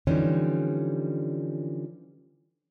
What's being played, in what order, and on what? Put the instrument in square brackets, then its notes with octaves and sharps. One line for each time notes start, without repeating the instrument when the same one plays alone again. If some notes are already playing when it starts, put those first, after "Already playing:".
[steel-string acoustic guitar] D3 E3 F3 G3 C#4 D#4